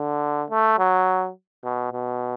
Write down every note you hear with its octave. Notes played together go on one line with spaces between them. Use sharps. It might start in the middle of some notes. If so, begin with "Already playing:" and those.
Already playing: D3
A3
F#3
B2
B2